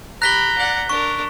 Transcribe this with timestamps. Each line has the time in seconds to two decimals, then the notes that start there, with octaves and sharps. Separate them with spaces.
0.22 G4 A#5 B5 F#6 B6 G7
0.57 D5 F#5
0.89 D4 A#4 C#6